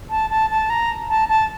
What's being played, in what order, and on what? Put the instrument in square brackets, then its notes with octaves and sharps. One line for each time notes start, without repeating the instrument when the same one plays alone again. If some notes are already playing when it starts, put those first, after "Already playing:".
[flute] A5
A5
A5
A#5
A5
A5